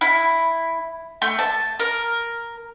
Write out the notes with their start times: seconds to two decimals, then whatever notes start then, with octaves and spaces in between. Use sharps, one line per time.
0.01 E4
1.22 A3
1.39 A5
1.80 A#4